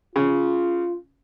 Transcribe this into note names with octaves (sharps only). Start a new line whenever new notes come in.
C#3 F4